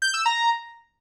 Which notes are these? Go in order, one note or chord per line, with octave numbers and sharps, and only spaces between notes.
G6
E6
A#5